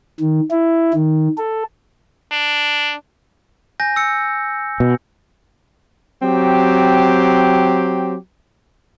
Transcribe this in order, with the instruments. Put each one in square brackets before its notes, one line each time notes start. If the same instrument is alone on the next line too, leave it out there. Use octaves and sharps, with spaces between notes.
[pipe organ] D#3
E4
D#3
A4
[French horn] D4
[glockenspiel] G#5 G6 A#6
E6 C#7
[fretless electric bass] B2
[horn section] F#3 C4 G4